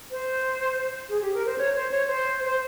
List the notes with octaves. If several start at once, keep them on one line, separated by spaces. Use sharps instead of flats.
C5
G#4
G4
A#4
C5
C#5
C5
C#5
C5
C5